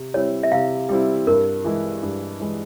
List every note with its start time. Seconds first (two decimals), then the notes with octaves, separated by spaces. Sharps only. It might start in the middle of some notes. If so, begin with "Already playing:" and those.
Already playing: C3
0.14 G3 C4 E4 C#5
0.43 E5
0.52 C3 F5
0.89 G3 C4 E4
1.27 G2 A#4
1.64 E3 G#3 E4
2.03 G2
2.40 E3 G#3 E4